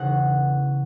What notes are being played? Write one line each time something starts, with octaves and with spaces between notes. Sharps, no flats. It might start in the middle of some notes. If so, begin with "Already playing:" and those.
Already playing: E1 C#3 F#5